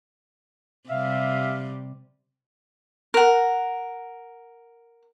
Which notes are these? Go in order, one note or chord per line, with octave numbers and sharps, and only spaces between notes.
C3 G3 E5 F5
A#4 F#5